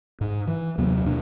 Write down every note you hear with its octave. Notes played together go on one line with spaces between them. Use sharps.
G#2
E3
D#2 C3 F#3 B3
D#2 B2 D4